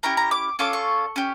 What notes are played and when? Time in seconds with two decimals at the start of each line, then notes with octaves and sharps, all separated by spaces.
0.03 C#4 E4 G4 A#5
0.17 A#5
0.31 D6
0.59 C#4 F4 A4 D6
0.73 C#6
1.16 C#4 G4